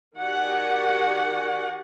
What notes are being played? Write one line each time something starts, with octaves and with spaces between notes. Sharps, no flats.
D#3 F#4 G4 D5 F#5 G#5